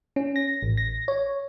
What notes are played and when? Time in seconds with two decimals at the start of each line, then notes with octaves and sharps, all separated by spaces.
0.16 C#4
0.36 A#6
0.62 A1
0.77 A#6
1.08 C#5